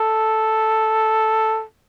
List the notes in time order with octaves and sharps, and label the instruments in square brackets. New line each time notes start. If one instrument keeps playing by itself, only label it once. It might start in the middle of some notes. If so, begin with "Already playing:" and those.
Already playing: [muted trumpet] A4